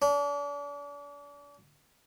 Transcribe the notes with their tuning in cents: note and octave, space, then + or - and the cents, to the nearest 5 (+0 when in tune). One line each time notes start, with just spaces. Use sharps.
D4 -40